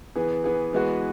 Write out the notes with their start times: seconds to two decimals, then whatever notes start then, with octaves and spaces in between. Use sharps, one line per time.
0.16 E3 B3 G#4
0.44 E3 B3 G#4
0.73 E3 G#3 B3 F#4 B4